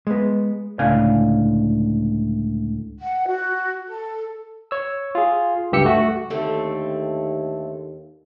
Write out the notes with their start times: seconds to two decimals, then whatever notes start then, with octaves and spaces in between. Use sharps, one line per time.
0.07 G#3 B3
0.79 C#2 A2 D3 F5 G#5
2.98 F#5
3.27 F#4
3.85 A4
4.71 C#5 E6
5.15 F4 G#4
5.72 C#2 G2 G4 E6 C#7
5.85 A3 F#4
6.30 D#2 D3 A3 C4